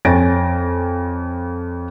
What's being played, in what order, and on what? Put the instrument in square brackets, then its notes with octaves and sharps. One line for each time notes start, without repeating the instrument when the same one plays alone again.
[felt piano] F2 C#5 G#5 A6 A#6 D7